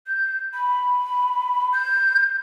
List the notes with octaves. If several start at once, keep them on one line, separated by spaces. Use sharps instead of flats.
G6
B5
G6